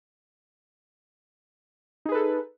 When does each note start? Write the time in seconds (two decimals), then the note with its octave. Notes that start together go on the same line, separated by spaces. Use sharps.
2.05 D#4
2.09 G#4
2.12 B4
2.15 A4